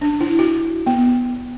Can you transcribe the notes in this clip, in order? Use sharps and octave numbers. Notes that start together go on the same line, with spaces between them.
D4
E4
F#4
B3